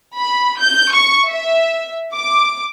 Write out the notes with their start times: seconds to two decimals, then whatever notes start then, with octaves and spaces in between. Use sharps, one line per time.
0.18 B5
0.60 G6
0.94 C#6
1.28 E5
2.16 D6